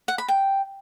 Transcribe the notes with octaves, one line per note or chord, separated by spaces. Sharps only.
F#5
B5
G5